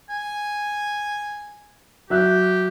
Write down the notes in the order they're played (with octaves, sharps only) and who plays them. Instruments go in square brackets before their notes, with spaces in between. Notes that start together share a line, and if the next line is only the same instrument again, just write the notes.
[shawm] G#5
[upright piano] F#3 E5 F#6 [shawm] G4